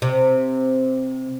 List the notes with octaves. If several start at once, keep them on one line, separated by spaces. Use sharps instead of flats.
C3